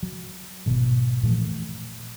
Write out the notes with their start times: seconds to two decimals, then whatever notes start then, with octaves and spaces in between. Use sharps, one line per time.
0.03 F#3
0.66 G#1 B2 F#3
1.23 A#2 E3 F3 A3